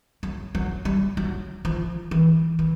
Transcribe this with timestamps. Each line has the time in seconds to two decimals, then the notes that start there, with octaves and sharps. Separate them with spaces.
0.23 F#3
0.55 F#3
0.85 G3
1.17 F#3
1.65 F3
2.11 E3
2.59 E3